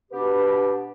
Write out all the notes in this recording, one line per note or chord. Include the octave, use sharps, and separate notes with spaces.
B2 B3 D4 G4 B4